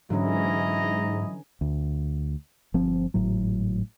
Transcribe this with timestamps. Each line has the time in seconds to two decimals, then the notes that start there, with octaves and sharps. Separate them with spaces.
0.10 G#2 D3 E3 F#3 C#4 E4 D#5 A#5
1.61 D2
2.74 G1 F3 C4
3.14 G#1 A2 F#3